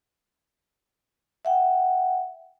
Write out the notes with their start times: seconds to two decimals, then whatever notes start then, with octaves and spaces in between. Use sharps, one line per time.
1.45 E5 F#5 G5